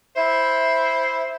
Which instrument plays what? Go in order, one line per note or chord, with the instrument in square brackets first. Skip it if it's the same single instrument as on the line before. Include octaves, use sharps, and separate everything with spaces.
[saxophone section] E4 C5 E5